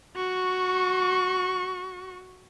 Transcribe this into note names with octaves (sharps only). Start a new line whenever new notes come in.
F#4 C#6